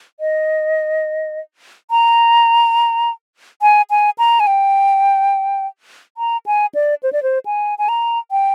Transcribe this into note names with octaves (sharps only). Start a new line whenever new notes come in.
D#5
A#5
G#5
G#5
A#5
G#5
G5
A#5
G#5
D5
C5
D5
C5
G#5
G#5
A#5
G5